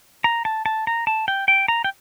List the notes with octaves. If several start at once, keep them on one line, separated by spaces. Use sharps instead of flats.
A#5
A5
A5
A#5
A5
G5
G5
A#5
G5